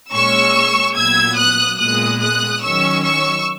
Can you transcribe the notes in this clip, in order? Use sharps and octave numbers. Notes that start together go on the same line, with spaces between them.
A#2 G#3 C#4 C#6 E6
A#2 F#3 B3 E6 G#6
D#6 F#6
A#2 G#3 B3 D#6 F#6
D#6 F#6
D#3 F#3 C#4 C#6 E6
C#6 E6